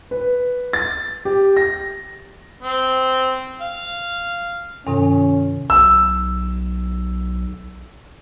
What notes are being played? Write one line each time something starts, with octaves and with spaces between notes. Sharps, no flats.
B4
A6
G4
A#6
C4
F5
G2 C3 D#3 C#4
B1 E6